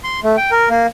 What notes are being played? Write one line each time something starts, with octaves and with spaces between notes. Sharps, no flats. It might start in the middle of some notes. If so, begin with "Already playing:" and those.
C6
A3
G5
A#4
A#3